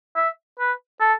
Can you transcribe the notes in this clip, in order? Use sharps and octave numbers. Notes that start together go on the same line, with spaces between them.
E5
B4
A4